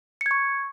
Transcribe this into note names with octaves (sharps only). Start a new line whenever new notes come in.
C#6 G#6 C#7